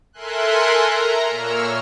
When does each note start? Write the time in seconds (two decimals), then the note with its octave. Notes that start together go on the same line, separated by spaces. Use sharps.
0.13 A4 A#4 E5 G#5 C6 F#6
0.71 A#5
1.29 A#2 A#3 C#5 E6 F6